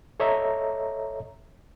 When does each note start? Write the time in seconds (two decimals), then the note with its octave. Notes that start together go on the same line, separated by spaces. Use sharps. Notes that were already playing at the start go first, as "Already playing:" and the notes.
0.20 A4 C#5 D#5 E5 A#5